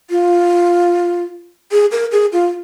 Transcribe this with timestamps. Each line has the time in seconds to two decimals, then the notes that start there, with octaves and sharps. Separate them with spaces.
0.10 F4
1.72 G#4
1.92 A#4
2.12 G#4
2.33 F4